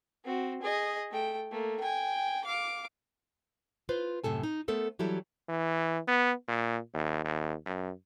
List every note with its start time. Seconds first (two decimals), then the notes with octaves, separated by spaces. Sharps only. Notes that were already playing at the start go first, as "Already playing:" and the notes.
0.24 C4 F#4
0.62 G#4 D#5
1.11 A3 G5
1.51 A3 A#3
1.80 G5 G#5
2.44 F5 D6
3.89 F4 B4 C5
4.24 F#2 A2 C3 A4 G#5
4.43 D#4
4.68 A3 B3 A4 A#4 C5
4.99 E3 F#3 G3 E4 G4 A4
5.48 E3
6.08 B3
6.48 A#2
6.93 D#2
7.24 D#2
7.66 F#2